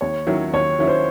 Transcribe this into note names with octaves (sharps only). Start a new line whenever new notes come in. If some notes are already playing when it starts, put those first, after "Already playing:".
D#2 C#5
D#3 F#3 C#4 E4
D#2 C#5
D#3 F#3 C#4 E4
C5